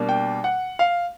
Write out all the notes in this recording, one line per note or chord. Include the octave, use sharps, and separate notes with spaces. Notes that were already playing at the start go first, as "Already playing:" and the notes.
Already playing: B2 G3 A#3 D4
G5
F#5
F5